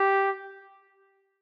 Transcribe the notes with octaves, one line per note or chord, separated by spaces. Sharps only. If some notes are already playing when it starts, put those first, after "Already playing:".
Already playing: G4